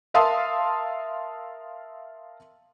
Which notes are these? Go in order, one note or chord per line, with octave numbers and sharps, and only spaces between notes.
A#4 E5 F5 A5 C6 D#6